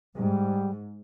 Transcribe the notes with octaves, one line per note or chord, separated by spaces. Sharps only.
G#2 G3